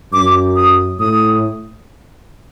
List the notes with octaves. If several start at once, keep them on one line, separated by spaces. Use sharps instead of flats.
F#2 D6
D#6
A2 D#6